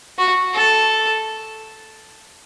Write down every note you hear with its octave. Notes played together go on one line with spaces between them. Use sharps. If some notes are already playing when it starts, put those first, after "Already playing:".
F#4
A4